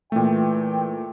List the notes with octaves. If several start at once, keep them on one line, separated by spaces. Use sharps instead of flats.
A#2 E3 A3 G5